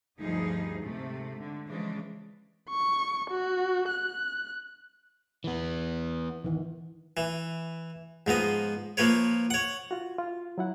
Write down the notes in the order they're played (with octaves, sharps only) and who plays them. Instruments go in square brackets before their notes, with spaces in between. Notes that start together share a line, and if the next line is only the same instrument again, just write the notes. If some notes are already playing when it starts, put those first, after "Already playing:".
[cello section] D2 G2 F3 G3 D#4 G#4
G#2 C3 A3
D3
C#3 E3 F3 G#3 D4
[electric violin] C#6
F#4
F#6
[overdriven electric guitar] E3 B3
[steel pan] D#3 E3
[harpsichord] E3
G#2 F3 B3 D#5
F3 A#3 B4 C#5
C#5 F#5
[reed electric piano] F4 F#4
F4
F#3 E4 F#5